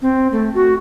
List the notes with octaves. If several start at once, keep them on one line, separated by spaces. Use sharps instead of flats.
C4
A3
F#4